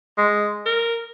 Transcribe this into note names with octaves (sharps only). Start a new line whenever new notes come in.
G#3
A#4